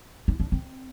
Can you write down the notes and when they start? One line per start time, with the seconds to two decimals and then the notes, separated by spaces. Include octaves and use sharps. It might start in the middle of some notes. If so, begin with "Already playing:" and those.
0.28 D#4
0.40 D4
0.52 C4